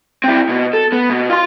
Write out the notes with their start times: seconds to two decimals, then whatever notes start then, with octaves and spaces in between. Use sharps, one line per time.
0.24 C4 E4
0.49 B2
0.73 A4
0.92 B3
1.10 B2
1.30 F4 C6